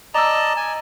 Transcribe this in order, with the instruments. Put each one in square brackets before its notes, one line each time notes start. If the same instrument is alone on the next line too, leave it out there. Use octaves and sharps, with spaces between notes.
[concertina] D5 D#5 A5 [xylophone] A#5 E6
[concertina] G#5